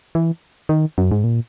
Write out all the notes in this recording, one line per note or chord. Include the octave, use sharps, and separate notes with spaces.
E3
D#3
F#2
G#2
A#2